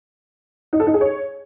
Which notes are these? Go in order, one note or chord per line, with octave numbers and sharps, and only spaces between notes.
D#4
A4
D#4
G#4
C#5